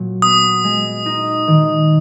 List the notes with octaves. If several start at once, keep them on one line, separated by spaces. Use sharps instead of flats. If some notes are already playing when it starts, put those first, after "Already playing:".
Already playing: A#2 F#3 F#4
B3 D#6
G#3
D#4
D#3